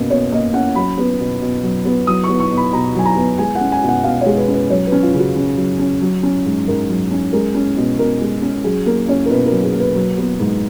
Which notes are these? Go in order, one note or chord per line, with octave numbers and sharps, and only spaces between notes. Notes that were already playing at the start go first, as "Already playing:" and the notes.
Already playing: B2 A#3 C#4
B2 C#5
A#3 D#5
C#4 F#5
F#3 B5
B3
B2
B2
F#3
B3
F#3 D#6
C#6
B3
C#6
B2
B5
B2 A#5
F#3 G#5
A#5
B3
G#3 G#5
F#5
C#4
G#5
B2
F#5
B2 F5
C#5
G#3
B4
C#4
B4
F#3 C#5
B4
C#4
F4
C#3
F#4
C#3
F#3
C#4
F#3
C#4
G#2
G#2 A#4
F#3
C#4
G#3 A#4
C#4
B2
B2 A#4
G#3
C#4
F#3 G#4
A#3 A#4
C#4 C#5
A#4
B2 B4
A#4
F#3
G#4
A#3
B4
F#3
B3
G#2